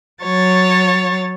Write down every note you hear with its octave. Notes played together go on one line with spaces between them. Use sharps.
F#3 C#5 A6